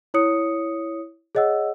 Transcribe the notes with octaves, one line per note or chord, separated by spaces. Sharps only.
E4 C#5 D#6 C#7
G#4 C#5 D#5 F#5 E6